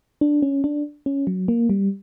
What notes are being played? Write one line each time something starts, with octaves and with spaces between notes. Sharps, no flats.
D4
C#4
D4
C#4
F#3
A#3
G3